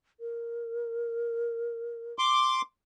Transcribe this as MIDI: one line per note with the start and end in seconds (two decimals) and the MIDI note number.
0.20 2.13 70
2.19 2.61 84
2.19 2.61 86